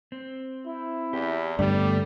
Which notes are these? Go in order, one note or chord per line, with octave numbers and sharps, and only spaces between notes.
C4
E4
E2 G4
G2 D3 G3 A3 B3 D5